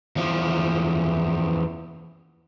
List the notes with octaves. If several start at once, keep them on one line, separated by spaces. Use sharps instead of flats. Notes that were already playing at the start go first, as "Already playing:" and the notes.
E2 F3